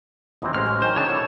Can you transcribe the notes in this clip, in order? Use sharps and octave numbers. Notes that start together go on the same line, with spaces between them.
D#2 E3 F#3 C4 E4 D#5
A1 G#3 C5 F6
C#4 E5
D#3 F#3 C#4 C5 G#5
C#3 D4 C#5 A5
A2 E4 D5 F#5